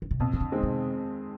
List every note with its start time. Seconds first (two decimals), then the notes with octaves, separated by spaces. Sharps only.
0.02 D3
0.11 C3
0.20 F2 A#2
0.33 D#3
0.40 D3
0.52 D#3 G#3 C4
0.63 C3